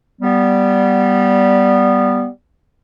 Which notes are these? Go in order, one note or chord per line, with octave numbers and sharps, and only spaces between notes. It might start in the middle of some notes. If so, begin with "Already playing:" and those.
G3 B3